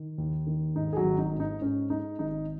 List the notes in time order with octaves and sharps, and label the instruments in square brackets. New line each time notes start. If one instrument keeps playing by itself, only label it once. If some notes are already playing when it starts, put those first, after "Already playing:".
Already playing: [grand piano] D#3
D#2
D#3
G#2 D#4
G#4
F#3 F#4
G#1
D#4
G#2
D#4
G#2 C#4
G#3 D#4
G#1 D#4